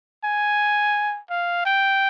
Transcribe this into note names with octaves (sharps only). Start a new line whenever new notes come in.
G#5
F5
G5